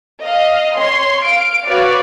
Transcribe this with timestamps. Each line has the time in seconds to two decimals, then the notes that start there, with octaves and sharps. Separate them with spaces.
0.24 D#5 F5
0.76 C#5 C6
1.24 F5 D7
1.66 F#4 B4 C#5 D5 F5